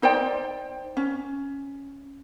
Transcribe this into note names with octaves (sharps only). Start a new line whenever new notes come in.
D#4 C5 D5 G5
C#4